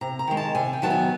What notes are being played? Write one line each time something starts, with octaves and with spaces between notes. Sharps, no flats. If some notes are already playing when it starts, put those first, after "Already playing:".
C3 A#5
A#5
D#3 G#3
A5
C3 G#5
G5
D#3 F#3 B3 A5
G#5